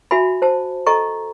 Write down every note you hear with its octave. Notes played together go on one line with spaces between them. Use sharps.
F#4 E5 G#5 B5
C5 A5
A4 D#5 A#5 C#6